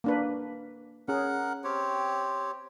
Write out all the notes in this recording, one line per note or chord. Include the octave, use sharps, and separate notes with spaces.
A#3 D4 B4
C#4 G#4 A#4 F#5
C4 G4 C#5